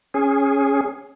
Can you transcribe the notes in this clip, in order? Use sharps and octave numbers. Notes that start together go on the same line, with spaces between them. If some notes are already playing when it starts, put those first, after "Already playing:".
C#4 G#4